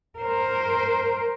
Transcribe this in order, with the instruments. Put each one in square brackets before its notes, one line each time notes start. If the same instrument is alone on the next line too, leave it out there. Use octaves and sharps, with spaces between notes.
[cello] A#4 C5